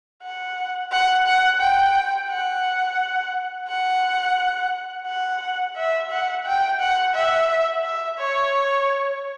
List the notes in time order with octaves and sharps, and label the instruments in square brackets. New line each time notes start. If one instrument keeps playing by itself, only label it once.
[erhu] F#5
F#5
F#5
G5
F#5
F#5
F#5
E5
F#5
G5
F#5
E5
E5
C#5